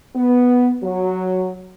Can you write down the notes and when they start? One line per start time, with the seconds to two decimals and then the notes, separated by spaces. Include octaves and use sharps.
0.16 B3
0.83 F#3